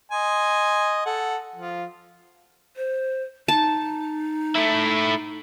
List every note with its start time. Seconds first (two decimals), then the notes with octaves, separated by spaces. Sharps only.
0.12 D#5 G#5 C6
1.06 A4 F#5
1.56 F3 F4
2.76 C5
3.48 D#4 A5
4.56 A3 E4